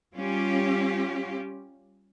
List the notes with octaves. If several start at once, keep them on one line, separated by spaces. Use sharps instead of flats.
G3 C#4 F4 G4